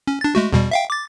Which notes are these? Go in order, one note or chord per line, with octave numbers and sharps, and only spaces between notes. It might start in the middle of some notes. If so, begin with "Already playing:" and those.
C#4
D4 A6
G#3 A3 F#4
E2 B2 G3
E5 F5 G5
D6 A6